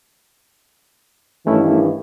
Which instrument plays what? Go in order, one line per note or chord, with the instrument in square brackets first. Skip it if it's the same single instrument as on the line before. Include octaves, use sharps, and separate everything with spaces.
[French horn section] G2 D#3 E3 [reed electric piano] A3 C#4 E4